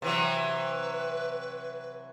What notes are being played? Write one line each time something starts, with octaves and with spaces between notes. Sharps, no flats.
C3 E3 F#3 B4